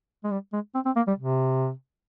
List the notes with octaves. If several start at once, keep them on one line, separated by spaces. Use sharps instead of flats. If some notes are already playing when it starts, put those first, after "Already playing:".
G#3
G3
G#3
C4
C4
A#3
G3
C3